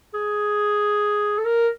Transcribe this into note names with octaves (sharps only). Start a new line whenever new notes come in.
G#4
A4
A#4